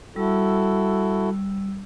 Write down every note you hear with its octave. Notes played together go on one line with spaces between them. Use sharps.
G3 E4 F#4 A4 E6